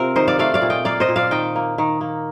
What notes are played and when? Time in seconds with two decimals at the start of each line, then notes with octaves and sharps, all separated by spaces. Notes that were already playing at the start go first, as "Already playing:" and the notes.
Already playing: C3 C4 F4 A#4 F5
0.16 D#3 C5 D#5
0.28 D5 F5
0.39 A3 D5 F5
0.54 D5 F5
0.62 A#2
0.70 D#5 G5
0.85 A#3 D5 F5
1.00 C5 D#5
1.09 A#2
1.16 D5 F5
1.31 D#3 D#5 G5
1.56 A#3
1.78 D#3
2.01 A#3